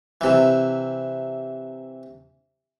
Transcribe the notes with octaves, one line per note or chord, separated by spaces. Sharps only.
C3 E3